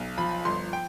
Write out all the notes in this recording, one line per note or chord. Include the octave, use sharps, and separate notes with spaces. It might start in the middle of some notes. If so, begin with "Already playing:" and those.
Already playing: B1
F3 B5
G1 C6
G5